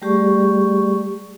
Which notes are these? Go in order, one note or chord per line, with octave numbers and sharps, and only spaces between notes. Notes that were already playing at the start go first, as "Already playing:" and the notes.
G3 A3 G4 G#4 D5 C#6